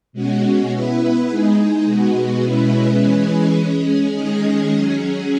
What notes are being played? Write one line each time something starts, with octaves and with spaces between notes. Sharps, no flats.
B2 G#3 C#4 F#4
B3 E4 B4
G#3 D#4 G#4
B2 G#3 B3 F#4
B2 G#3 C#4 E4 B4
E3 G#3 C#4 G#4 B4
G#3 C#4 G#4
D#3 G#3 C#4 G#4 D#5
F#3 C#4 G#4